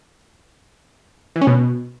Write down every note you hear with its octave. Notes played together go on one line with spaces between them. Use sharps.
E3
C#4
B2